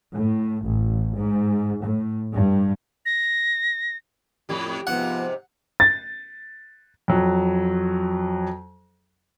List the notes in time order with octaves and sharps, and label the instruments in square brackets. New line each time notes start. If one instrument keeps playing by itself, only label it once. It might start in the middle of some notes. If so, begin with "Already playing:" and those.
[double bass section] A2
A1
G#2
A2
G2
[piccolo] A#6
[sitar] F2 A2 G4
[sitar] G#2 C3 [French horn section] F3 B3 [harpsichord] F#5
[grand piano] A6
F2 F#3